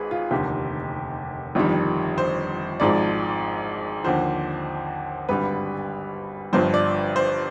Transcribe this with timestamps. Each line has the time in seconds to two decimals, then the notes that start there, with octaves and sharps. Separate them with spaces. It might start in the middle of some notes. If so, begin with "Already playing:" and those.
Already playing: G#1 G#2 G#4 B4
0.11 F4
0.31 F1 D#2 D3 G4
1.55 G1 F2 D#3 G3
2.18 C5
2.80 G#1 G#2 F3 D5
4.04 D#2 D3 F3 C5
5.29 G#1 G2 D3 G3 B4
6.53 G1 G2 F3 C5
6.74 D5
7.16 C5